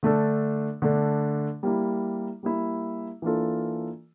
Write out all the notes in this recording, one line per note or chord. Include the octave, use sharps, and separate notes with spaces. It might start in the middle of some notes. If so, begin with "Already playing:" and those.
D3 A3 D4 A4
D3 A3 D4 A4
G3 A#3 E4
G3 A#3 E4
E3 A#3 D4 F4 A4